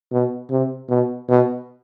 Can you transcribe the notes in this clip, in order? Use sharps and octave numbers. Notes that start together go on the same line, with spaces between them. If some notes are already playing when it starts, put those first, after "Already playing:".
B2
C3
B2
B2